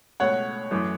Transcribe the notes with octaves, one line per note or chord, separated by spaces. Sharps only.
C#2 B2 A3 C#5 F#5
F#2 E3 A3